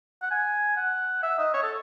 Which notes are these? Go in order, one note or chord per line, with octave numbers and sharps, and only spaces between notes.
F#5
G#5
F#5
E5
D#5
C#5
A4